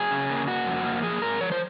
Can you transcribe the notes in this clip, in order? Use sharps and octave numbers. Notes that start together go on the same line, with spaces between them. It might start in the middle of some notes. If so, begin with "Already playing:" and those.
Already playing: F#3 G#4
C#3
A#3
A#3 F#4
F2
A#3
F3 G#4
G#2 A#4
F3 C#5
C5